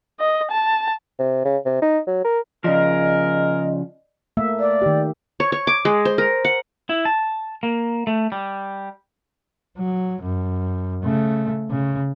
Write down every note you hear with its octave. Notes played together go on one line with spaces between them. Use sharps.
D#5
A5
C3
C#3
C3
D#4
F#3
A#4
C#3 F3 G#4 A#4 D5 D#5
A3 A#3 E5
D5
D#3 G4
C#5
C#5
D6
G#3
C5
A#4
F#5
E4
A5
A#3
A3
G3
F#3
F#2
C#3 A3
C#3